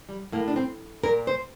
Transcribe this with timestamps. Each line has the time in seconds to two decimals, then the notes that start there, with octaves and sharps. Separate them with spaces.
0.09 G3
0.32 A2 A#3
0.48 D4
0.56 C4
1.03 A#2 A#4
1.27 C5